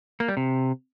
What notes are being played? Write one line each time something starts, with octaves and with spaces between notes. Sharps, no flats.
A#3
G3
C3